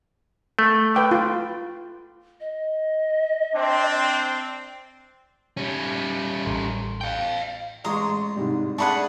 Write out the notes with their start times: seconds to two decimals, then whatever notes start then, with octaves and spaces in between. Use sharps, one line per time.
0.59 A3
0.95 B4 G5 D6
1.11 F4
2.40 D#5
3.55 C4 D4
5.57 G3 C#4
6.46 A1
7.01 F5 G5
7.85 A1 G#3 A#5 C6 C#6 D#6
8.36 G#2 C3 G3
8.78 A3 D4 G#4 F#5 A5 B5 C#6